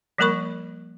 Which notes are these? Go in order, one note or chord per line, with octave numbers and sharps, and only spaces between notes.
F3 G3 A#3 A#4 B5 C#6